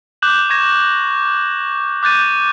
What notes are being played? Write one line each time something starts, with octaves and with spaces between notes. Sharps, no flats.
D6 F#6 G6 E7 F#7
C#6 G#6 A#6 E7
D6 F#6 G6 A6 D#7